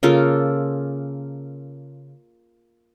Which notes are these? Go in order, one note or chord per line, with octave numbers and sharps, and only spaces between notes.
C#3 A#3 F4 A4